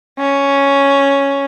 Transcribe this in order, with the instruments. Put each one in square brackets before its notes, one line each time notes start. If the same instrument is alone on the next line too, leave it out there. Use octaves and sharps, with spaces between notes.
[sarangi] C#4